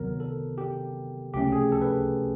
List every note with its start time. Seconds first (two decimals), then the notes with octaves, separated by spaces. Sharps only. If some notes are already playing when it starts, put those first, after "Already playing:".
Already playing: D2 C3 D#3 F#3 B3 A#4
0.20 A4
0.58 G4
1.34 C#2 C3 F3 A3 C#4 G4
1.52 G#4
1.72 A4
1.82 B4